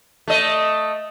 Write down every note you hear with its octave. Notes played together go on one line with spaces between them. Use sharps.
A3 D#5